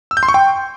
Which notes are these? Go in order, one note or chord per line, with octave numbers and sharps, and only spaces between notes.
E6
G6
C6
C#6
G5